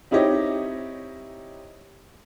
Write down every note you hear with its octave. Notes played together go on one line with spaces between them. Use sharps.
C4 D#4 E4 G4 C#5 D#5